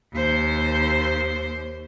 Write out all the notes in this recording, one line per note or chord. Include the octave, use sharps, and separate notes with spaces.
D#2 C5